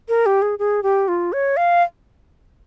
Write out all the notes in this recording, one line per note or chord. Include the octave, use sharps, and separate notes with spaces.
A#4
G4
G#4
G#4
G4
F4
C#5
F5